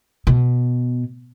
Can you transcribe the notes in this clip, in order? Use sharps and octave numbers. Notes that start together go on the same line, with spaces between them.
B2